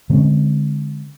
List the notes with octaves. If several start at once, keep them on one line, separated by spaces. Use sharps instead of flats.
D3 G#3 C4 C#4